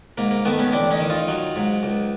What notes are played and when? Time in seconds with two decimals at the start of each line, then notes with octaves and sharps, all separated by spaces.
0.18 G#2 A#3
0.31 A#3
0.45 D#3 A3 B3
0.59 B3 C#4
0.72 A1 C4 D4
0.91 C#4 D#4
1.00 D#3
1.10 D#4 F4
1.28 F#3
1.56 G#2
1.83 C#2